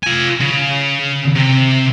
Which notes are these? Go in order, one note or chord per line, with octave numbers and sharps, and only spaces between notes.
F4 G#5
C#3
C3